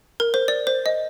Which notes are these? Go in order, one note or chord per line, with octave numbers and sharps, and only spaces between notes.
A#4
C5
D5
C5
D#5